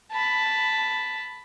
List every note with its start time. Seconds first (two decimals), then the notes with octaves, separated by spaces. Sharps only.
0.11 A5 B5